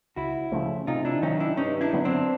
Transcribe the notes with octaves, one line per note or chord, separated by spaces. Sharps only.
C#2 E4 F#4
C#3 F3 A3
C3 D#4 F4
D4 E4
D#3 F#3 C#4 D#4
D4 E4
G2 C#4 D#4
D4 E4
D3 F#3 B3
C4 D4